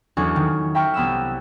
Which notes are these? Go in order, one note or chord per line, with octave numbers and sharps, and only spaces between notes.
E2 F#3 C#4 D4 A4 C#6
D#3
E5 G5 A#5 C#6 F6
C2 B3 E6 E7